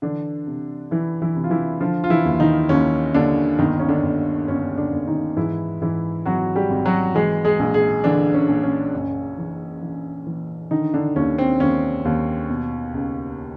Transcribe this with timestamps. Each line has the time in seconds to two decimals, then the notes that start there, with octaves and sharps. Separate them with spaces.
0.02 D3 E3 D4
0.47 C3
0.91 E3 E4
1.22 E3 E4
1.36 C3
1.44 F4
1.50 E3 E4
1.80 D3 F3 F4
2.04 F4
2.10 E3 E4
2.25 D#2
2.40 D#3 D#4
2.69 D#2 C#4
3.14 D#2 D3 D4
3.59 G1 D#3 D#4
3.80 C#4
3.89 D3 D4
4.03 G1
4.48 G1 C#4
4.77 D3 D4
4.92 G1
5.07 D#3 D#4
5.37 G#2 E3 E4
5.81 G#2 E3 E4
6.26 G#1 F#3 F#4
6.56 G3 G4
6.70 G#1
6.85 F#3 F#4
7.15 E3 G#3 G#4
7.45 G#3 G#4
7.59 A#1
7.74 G#3 G#4
8.04 D3 E3 D4
8.34 C#4
8.49 A#1
8.63 C#4
8.93 F#1
9.38 E3
9.82 E3
10.27 E3
10.71 D3 D#3 D#4
10.94 D3 D4
11.16 D#2 C#4
11.38 C4
11.60 D#2 C#4
12.05 D#2
12.49 B2
12.94 C#2